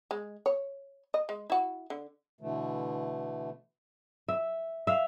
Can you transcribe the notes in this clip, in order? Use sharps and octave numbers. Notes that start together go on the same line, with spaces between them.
G#3
C#5
D#5
G#3
E4 F#4
D3
B2 D3 E3 A3
E5
E5 F5